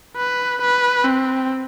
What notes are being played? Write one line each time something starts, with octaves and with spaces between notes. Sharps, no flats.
B4
B4
C4